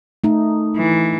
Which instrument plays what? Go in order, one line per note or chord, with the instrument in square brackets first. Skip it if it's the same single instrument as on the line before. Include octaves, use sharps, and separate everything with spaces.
[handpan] A3 D#4
[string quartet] E3